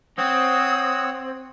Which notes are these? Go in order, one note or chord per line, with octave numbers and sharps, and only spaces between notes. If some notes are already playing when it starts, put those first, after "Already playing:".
C4 C#5 F#5 D#6 E6